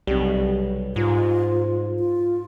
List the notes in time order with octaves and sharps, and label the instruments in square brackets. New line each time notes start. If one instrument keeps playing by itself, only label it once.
[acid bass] B1 [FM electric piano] C3 G3
[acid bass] G#2 [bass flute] F4
[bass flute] F4